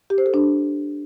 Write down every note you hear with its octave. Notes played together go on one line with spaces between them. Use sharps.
G4
C5
A4
D4